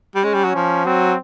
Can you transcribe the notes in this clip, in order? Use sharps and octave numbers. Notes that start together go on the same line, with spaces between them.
G3
G#3 C#4
G3
F#3
F3
F#3 C4